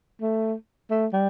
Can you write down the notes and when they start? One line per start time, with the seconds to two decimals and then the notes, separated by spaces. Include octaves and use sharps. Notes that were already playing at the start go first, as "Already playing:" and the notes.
0.22 A3
0.91 A3
1.13 G3